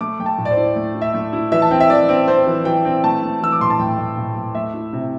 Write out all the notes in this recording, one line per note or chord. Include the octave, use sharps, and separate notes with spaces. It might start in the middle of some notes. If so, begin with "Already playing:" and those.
A3 D6
A3 G5
A5
A2
D5
C5
E4
A3
E4
E5
A3
E4
E3 E5
A5
C4 G5
E5
E3 D5
C4
C4 C5
E3
E3 G5
C4
A3 A5
A3
E3 E6
D6
A2 C6
A5
A2 G5
A2
A2
A2
A3 E5
E4
C3